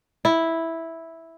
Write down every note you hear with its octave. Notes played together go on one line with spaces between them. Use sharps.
E4